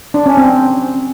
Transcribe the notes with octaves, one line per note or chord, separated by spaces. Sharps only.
D4
C#4
C4